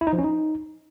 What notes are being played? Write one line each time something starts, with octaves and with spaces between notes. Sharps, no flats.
E4
D#4
F3
C#4
D#4